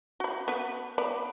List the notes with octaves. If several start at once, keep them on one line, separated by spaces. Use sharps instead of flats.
F#4 B5
B3 B4
B3 D5 B5